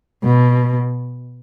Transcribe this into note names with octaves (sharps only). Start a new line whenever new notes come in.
B2